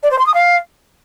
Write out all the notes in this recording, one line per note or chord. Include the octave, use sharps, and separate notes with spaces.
D5
C5
C6
D#6
F5